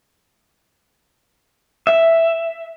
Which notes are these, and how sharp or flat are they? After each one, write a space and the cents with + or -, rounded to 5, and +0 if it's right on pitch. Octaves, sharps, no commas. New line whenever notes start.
E5 +5